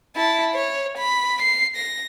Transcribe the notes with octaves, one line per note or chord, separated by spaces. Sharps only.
E4 A5
C#5
B5
C7
A#6